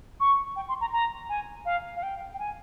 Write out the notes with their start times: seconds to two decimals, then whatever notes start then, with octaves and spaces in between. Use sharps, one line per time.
0.20 C#6
0.56 G5
0.69 C6
0.81 A#5
0.93 A#5
1.29 G#5
1.65 F5
1.96 F5
2.03 G5
2.34 G5
2.39 G#5